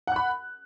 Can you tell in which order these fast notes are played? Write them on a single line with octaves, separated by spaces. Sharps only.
F#5 F#6 B5